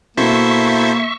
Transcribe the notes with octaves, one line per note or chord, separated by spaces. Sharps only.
B2 A#3 E4 A4 C5 E5 C#6